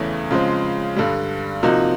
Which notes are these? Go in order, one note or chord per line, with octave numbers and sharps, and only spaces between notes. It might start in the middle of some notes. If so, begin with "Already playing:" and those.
Already playing: E2 C#3 E3 A3 C#4
C#3 F3 G#3 C4
G2 D3 G3
C3 F3 A#3 D#4 F#4